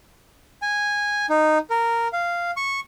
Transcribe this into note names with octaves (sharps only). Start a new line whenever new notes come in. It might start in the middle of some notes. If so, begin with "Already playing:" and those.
G#5
D#4
A#4
F5
C#6